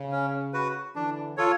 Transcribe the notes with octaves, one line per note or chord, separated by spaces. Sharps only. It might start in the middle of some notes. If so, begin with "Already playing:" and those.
Already playing: C#3
C#4
F#4 B4
D3 E3 D4
F4 A4 C#5